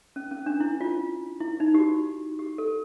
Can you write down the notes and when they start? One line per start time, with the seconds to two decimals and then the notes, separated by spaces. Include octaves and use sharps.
0.16 C#4
0.31 C#4
0.46 D4
0.60 E4
0.81 F4
1.40 E4
1.60 D#4
1.75 G4
1.79 F#4
2.39 G4
2.58 A4